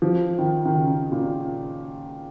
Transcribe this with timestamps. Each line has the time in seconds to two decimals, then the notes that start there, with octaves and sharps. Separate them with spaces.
0.02 F3
0.39 D#3
0.66 D#3
0.75 C#3
1.12 A#2